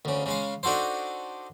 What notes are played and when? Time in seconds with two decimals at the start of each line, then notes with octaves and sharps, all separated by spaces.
0.05 D2 C#3
0.26 C#3 G#3 F5
0.63 D4 D#4 F#4 A4 C5